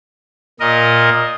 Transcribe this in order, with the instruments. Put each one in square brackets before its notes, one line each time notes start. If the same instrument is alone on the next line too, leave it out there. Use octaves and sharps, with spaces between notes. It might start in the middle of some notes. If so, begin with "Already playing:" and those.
[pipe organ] A#2 A#4 D#5